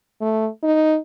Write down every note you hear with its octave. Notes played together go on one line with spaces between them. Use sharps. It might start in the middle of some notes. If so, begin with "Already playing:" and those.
A3
D#4